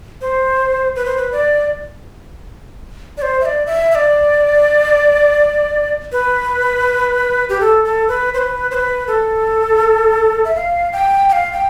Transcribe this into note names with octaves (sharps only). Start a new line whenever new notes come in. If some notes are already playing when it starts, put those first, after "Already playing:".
C5
B4
C5
B4
D5
D5
C5
E5
D5
E5
E5
D5
B4
G4
A4
A4
B4
C5
B4
C5
B4
A4
E5
F5
G5
G5
F5
G5